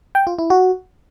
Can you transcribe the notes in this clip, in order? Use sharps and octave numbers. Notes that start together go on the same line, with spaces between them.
G5
F4
E4
F#4